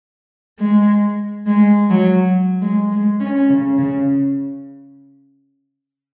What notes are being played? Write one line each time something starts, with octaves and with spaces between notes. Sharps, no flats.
G#3
G#3
F#3
G#3
G#3
C#4
C#3
C#3